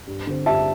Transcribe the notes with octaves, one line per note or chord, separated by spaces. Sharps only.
G2
D3 C4
G2 E5 A5